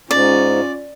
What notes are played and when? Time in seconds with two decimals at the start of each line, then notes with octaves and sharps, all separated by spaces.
0.11 G#2 C#4 F4 D5